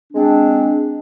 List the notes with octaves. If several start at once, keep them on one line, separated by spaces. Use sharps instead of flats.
G#3 C4 D4